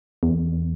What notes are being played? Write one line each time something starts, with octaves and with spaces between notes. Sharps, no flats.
E2